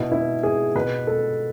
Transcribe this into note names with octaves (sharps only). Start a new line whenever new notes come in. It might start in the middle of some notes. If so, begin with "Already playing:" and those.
Already playing: B2 E4
E4
G#4
B2 B4
A4